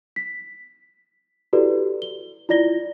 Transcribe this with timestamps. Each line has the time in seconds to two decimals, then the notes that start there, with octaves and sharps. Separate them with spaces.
0.16 B6
1.53 E4 F#4 G4 A4 B4 D5
2.02 G7
2.49 E4 F4 D5 A#6 G7